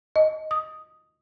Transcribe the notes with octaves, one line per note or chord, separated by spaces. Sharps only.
D#5
D#6